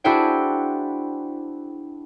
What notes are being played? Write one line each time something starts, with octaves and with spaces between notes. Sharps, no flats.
D4 E4 F#4 G#4 C5 G5